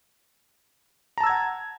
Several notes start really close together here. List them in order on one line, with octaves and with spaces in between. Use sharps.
A#5 A5 E6 G#6 F#5